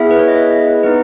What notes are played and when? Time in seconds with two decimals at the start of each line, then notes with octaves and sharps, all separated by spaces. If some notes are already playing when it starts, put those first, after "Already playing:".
Already playing: B3 E4 G#4 E5
0.11 B4
0.19 C#5
0.28 D#5
0.35 E5
0.51 D#5
0.67 B4
0.83 B3 D#4 B4